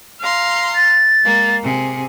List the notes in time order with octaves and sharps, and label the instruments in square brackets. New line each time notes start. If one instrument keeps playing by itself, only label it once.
[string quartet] F5 A#5 C6
[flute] A6
[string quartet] G#3 A#3
C3 G#4